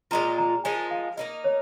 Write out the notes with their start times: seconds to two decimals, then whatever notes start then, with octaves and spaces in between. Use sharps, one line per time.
0.11 A#2 G#3 F4 A#5
0.38 A#5
0.64 F3 G#3 D#4 A#4 G#5
0.90 F5
1.17 A#3 D#4 A#4 D#5
1.44 C#5